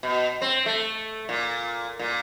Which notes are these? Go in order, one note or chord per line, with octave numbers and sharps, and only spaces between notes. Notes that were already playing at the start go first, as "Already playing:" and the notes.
B2
C4
A3
A#2
A#2